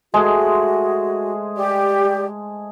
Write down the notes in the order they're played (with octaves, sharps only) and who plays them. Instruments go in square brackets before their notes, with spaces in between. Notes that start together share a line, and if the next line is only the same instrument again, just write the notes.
[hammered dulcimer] G#3 G#4 [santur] A3 C5 [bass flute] F#4
[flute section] G4 [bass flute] D5